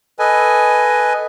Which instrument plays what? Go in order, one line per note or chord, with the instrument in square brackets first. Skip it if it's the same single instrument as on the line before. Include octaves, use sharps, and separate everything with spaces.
[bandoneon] A4 B4 D#5 G#5